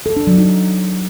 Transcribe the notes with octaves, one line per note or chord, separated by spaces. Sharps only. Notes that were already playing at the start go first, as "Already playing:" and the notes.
A4
D4
F#3
D#4